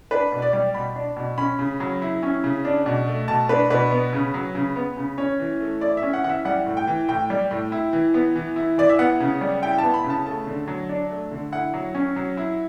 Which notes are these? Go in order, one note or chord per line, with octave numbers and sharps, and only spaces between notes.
D4 B4
B2
D5
G3
B2 B5
D4
B2
C#4 B5
C#3
F#3
E4
C#4
C#3
D4
B2
A3
B2 A5
D4 B4
B2 B4
B3
C#3
F#3
C#3
B3
C#3
C#4 C#5
E3
A3
E4 D5
E5
C#4
F#5
E3 F#5
E5
G3 F#5
A2
G5
E3
A2 G5
G3
A2
E4
E3
B3
E3
E4
E3 D5
E5
B3 F#5
C#3
G3
E4 G5
A5
B3
B5
C#3
A5
A3 A5
D3
F#3
D4
A3
D3
E4 F#5
F#3
C#4
F#3
E4